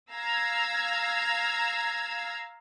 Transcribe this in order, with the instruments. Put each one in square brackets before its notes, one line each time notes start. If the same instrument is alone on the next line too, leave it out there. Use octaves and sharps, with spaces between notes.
[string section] F5 A#5 E6 G#6